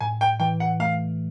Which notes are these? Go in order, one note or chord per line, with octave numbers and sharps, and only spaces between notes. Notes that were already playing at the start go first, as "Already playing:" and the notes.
A2 G#5
G5
E3 G5
F#5
A3 F5